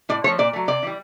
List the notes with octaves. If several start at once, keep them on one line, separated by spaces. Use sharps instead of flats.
A2 D5
F3 A3 C#5
A#2 D5
F#3 A3
C3 D5
E3 G3